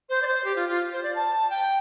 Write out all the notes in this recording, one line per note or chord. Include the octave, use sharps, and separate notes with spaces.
C5
D5
C5
G4
F4
F4
C5
D5
A5
G5